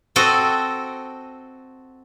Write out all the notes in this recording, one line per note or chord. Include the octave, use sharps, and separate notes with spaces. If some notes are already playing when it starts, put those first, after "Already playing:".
C4 F#4 A4 D#5